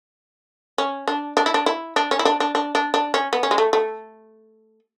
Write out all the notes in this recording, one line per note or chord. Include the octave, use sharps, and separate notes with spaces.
C#4
D4
D4
E4
D4
E4
D4
C#4
E4
D4
D4
D4
D4
D4
C#4
B3
C#4
G#3
A3
A3